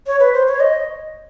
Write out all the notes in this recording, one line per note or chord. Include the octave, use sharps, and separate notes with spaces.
C#5
B4
C5
C#5
D#5